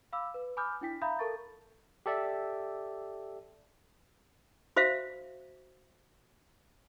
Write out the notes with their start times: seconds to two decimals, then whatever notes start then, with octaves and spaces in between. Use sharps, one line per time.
0.13 F5 B5 D6 E6
0.34 B4
0.57 G#5 B5 D6 D#6 F6 G6
0.81 D4 E4 G5 B6
1.02 E5 F5 A#5 B5 D#6 G6
1.19 A4 A#4 A5 C#6 A6
2.06 G4 A4 D5 E5
4.76 F#4 C5 E5 F5